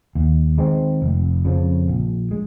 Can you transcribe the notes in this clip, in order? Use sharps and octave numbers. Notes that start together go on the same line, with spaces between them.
D#2
D#3 G#3 C4
F1
F2 C#3 F3
A#1
G#3